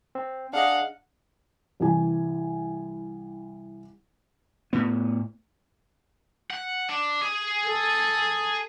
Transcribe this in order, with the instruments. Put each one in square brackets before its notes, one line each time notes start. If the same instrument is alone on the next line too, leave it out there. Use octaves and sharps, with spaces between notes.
[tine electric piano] C4
[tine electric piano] D4 G#4 D#5 [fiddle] F5 F#5
[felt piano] C2 E3 G#5
[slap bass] A2 B3
[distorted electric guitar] F#5
D4
G#4
[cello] A4